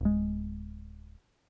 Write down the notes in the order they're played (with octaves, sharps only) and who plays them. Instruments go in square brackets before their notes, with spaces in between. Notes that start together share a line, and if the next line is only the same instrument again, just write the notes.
[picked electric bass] D1 G#3